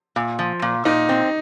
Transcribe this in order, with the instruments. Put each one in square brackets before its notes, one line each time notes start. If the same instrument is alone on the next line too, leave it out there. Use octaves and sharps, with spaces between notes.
[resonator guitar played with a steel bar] A#2
F3
A#2
[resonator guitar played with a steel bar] A#2 [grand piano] D#4
[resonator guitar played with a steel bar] C4